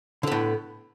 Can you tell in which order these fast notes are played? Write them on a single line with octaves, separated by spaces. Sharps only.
D3 B3 A2